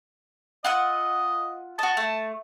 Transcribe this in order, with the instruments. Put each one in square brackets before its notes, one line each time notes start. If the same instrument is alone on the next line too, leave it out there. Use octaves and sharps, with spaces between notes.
[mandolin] F4 F#5 E6 [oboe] D#5
[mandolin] F#4 D#5 [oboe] A5
[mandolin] A3